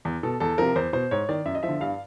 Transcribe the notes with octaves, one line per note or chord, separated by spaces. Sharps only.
E2
B2 A4
E2 A4
C3 F3 A#4
E2 C5
B2 C5
G#2 C#5
D#3 D5
F#2 E5
D#5
F3 E5
D3
G2 F5